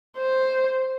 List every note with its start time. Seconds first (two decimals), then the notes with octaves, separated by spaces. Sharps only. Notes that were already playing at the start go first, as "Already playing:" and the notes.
0.18 C5